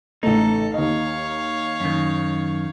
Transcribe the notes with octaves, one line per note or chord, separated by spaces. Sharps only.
A1 C#3 A3 D#4 A4
D#2 C#5 D#5 F5
F#2 D#3